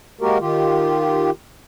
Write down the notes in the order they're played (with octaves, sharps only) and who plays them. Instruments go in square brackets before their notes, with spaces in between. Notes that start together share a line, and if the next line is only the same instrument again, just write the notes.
[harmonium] G#3 A#3 F#4 G4 A#4
D#3 F4 G4